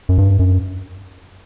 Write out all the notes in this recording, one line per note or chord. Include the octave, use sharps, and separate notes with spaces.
F#2
G2
F#2